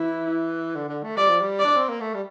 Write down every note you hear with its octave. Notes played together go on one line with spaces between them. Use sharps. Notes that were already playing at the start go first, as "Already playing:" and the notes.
Already playing: E3 E4
D3
D3
A3
G3 D5
F3
G3
D5
D4
C4
A#3
A3
G3